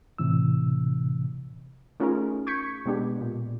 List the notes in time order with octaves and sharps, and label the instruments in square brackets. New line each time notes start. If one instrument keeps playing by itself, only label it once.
[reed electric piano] A2 C3 E3 E6
[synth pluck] A3 C#4 D#4 F4 G#4 A#4
C#6 G6 G#6 B6 C#7
B2 G#3 B3 D4 G4
A#2